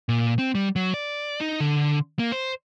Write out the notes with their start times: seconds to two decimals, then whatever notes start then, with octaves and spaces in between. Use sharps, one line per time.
0.09 A#2
0.39 C4
0.55 G3
0.76 F#3
0.94 D5
1.41 D#4
1.60 D3
2.19 A#3
2.32 C5